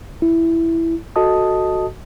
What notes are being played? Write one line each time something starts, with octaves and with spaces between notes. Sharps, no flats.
E4
F#4 A4 D#5 A5 D#6